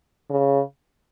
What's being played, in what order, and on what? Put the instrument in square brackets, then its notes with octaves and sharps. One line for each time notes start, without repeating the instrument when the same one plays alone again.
[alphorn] C#3